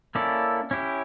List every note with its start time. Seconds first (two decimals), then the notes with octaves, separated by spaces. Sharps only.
0.15 A#3 C#4 E4 A4 D5
0.71 C#4 E4 G4